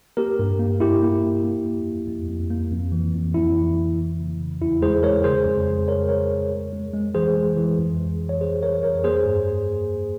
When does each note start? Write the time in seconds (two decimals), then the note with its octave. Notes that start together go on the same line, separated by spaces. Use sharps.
0.17 A#3 G4 A#4
0.39 G2
0.59 A#3
0.80 G2 E4 G4
1.03 A#3
1.23 G2
1.45 A#3
1.65 F2
1.87 A#3
2.07 F2
2.28 F2
2.50 A#3
2.72 F2
2.92 E3
3.14 F2
3.34 F2 E4
3.55 E3
3.77 F2
3.98 E3
4.19 C#3
4.39 C#3
4.61 E2 E4
4.82 G#3 G#4 C5
5.03 G#3 A#4 C#5
5.24 C#3 G#4 C5
5.46 F2
5.67 F2
5.88 F2 A#4 C#5
6.09 C#3 A#4 C#5
6.30 F2
6.51 G#3
6.73 G#3
6.93 G#3
7.15 E3 G#4 C5
7.36 G#3
7.56 E3
7.78 F2
7.99 E3
8.20 F2
8.29 C#5
8.41 F2 G#4 C5
8.62 E3 A#4 C#5
8.83 F2 A#4 C#5
9.04 A#3 G#4 C5
9.25 G2